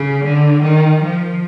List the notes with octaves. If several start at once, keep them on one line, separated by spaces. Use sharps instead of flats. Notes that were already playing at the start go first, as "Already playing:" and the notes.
Already playing: C#3
D3
D#3
F3